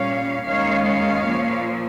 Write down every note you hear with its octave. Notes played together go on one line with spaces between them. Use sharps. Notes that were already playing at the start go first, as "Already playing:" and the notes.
Already playing: A#2 G3 C#4 C#5 F5
D#2 D#3 G#3 C#4 C#5 F5
C#5 F5
A#2 F3 A#3